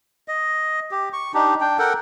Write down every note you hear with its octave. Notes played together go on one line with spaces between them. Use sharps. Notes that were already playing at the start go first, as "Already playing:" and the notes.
D#5
G4
C#6
D4 D#4 G4
D4 G5
A4 A#4 F#5 G5